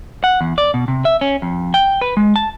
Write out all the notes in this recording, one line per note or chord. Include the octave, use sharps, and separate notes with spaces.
F#5
E2
D5
B2
C3
E5
C#4
F2
G5
B4
G#3
A5